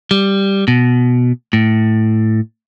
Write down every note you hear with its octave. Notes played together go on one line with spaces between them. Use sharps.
G3
B2
A2